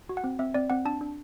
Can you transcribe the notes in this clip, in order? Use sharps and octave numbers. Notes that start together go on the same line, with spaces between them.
F#4
F#5
C4
C4 E5
C4 D5
C4 F#5
D4 A5
D4